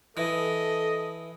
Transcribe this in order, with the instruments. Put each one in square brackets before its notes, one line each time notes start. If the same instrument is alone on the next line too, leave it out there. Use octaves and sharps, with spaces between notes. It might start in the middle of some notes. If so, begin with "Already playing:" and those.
[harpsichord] E3 [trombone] A4 [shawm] D#5